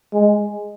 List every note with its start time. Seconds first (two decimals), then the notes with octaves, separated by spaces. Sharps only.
0.13 G#3